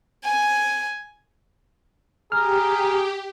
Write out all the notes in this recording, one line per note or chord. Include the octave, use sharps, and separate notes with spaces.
G#5
G4 G#4 A#5 F6